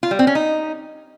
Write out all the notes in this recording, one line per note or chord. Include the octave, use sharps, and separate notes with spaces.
F4
G3
C4
C#4
D#4